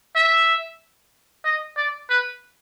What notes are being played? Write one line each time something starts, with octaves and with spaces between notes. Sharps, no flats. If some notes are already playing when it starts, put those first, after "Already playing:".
E5
D#5
D5
B4